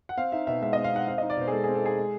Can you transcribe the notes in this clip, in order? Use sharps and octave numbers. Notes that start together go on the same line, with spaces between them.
F#5
C4 F5
D#4 E5
B2 E5
G#3 E5
C4 D#5
F5
D#4 F#5
C4 F5
D#4 D#5
D5
B2 C5
G#4
G#3 A4
C4 G#4
A4
D#4 G#4
G#3